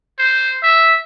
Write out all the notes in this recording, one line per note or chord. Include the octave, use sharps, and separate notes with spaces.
C5
E5